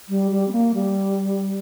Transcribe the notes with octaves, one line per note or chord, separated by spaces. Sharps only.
G3
G3
C4
A#3
G3